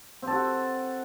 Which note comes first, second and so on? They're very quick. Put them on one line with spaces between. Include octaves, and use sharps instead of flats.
C4 A4 F#4